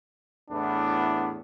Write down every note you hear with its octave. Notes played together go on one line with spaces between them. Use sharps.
E2 A2 B3 D4